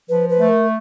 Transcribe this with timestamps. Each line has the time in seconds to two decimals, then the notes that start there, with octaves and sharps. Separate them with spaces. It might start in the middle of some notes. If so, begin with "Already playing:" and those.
0.09 F3 B4
0.29 B4
0.39 A3
0.49 A#4